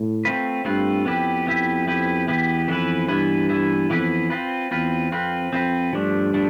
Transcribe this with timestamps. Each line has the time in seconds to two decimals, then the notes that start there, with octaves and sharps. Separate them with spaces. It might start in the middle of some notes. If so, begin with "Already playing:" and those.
Already playing: A2
0.25 A3 C4 F4 B4
0.65 G2 A3 C4 F4 B4
1.06 F2 B3 E4 G4 B4
1.47 B3 E4 G4 B4
1.87 B3 E4 G4 B4
2.28 E2 B3 E4 G4 B4
2.68 F2 E3 B3 E4 B4
3.08 G2 E3 B3 E4 B4
3.49 E3 B3 E4 B4
3.90 F2 E3 B3 E4 B4
4.30 C4 F4 B4
4.71 E2 C4 F4 B4
5.12 F2 C4 F4 B4
5.52 F2 C4 F4 B4
5.93 G2 F3 A3 D4
6.34 F3 A3 D4